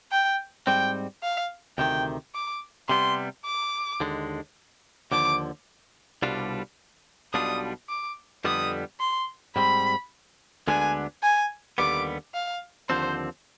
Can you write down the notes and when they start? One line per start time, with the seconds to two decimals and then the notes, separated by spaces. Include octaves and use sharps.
0.12 G5
0.66 G#2 G3 C4 G5
1.23 F5
1.78 D2 C3 D#3 G5
2.34 D6
2.89 C3 G3 B3 C6
3.45 D6
4.01 D#2 D3 G#3
5.11 D#2 D3 F3 D6
6.22 C2 B2 G3 D4 F4
7.33 B1 B2 G3 D4 F4 D#6
7.89 D6
8.44 F2 D3 G3 B3 D#6
9.00 C6
9.56 G#2 G3 C4 B5
10.67 D2 D3 G#3 B3 D4 G#5
11.23 G#5
11.78 D#2 D3 G3 B3 D6
12.34 F5
12.89 D#2 D3 F3 C4 C5